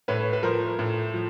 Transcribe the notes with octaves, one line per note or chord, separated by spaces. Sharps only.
A2 B4 C#5
B4
F3 A#4 C5
A2
F3